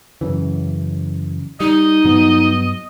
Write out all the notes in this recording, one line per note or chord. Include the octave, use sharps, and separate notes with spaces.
F#2 C#3 E3
G3 D#4 D#5
G2 F#3 B3